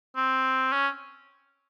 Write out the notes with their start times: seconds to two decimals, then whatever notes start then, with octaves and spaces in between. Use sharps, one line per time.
0.17 C4
0.73 C#4